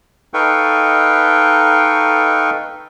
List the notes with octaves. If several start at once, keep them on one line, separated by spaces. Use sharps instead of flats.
D#4 A4 B4 F5 G5 C#6